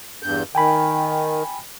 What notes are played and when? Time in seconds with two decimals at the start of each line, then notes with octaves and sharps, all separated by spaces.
0.23 E2 G2 G6
0.55 D#3 G5 G#5 B5